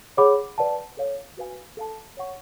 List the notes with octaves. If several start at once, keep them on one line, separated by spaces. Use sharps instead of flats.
G#4 C#5 F#5 B5 D6
B4 D5 F#5 A5
A4 C#5 F5
F#4 B4 F5 G#5
A4 F5 A5
C#5 F#5 C#6